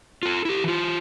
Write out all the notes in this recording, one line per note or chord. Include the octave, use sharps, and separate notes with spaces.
F4 A4
E4 G4
E3 F4